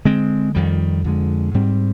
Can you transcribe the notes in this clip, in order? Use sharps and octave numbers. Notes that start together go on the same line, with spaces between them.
D3 G#3 C4
F2 D#3 G3
F2 D3 G#3
G#2 G3 C4